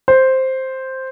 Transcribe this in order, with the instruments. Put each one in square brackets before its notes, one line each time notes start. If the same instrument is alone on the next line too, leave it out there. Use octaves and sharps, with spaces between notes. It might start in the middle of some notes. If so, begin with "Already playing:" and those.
[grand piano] C5